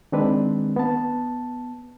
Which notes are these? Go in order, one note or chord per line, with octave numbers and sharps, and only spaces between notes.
D#3 G#3 C4 D4 B4
B3 A5